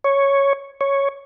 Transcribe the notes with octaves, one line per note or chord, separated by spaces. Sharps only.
C#5
C#5